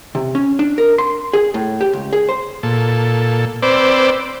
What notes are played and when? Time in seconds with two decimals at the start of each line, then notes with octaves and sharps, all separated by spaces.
0.15 C3
0.35 C#4
0.59 D4
0.78 A#4
0.98 C6
1.33 G#4
1.54 A2
1.81 G4
1.93 C#2
2.13 G#4
2.29 C5
2.63 A#2 A4
3.63 C4 B4 C5 D5 D6 E6